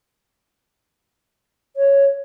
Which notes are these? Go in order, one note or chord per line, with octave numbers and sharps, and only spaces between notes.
C#5